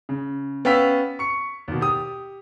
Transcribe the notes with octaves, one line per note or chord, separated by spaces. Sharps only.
C#3
B3 C#4 F5 G5 E6 B6
C#6 C#7
D#2 B2
G4 D#6